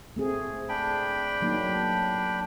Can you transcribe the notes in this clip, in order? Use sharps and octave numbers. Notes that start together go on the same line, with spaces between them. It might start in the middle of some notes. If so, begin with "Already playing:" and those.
A3 C4 G#4
D4 G5 B5
F#3 A#3 D#4